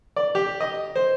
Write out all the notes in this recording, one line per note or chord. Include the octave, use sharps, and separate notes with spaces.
D5
G4
D#5
C5